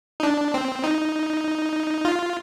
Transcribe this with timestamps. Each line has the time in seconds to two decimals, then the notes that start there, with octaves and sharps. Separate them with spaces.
0.20 D#4
0.23 D4
0.54 C4
0.84 D#4
2.05 F4